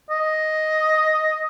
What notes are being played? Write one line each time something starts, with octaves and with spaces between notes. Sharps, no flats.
D#5